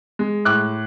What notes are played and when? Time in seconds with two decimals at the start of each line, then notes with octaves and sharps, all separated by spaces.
0.19 G#3
0.45 A2 D6 F#6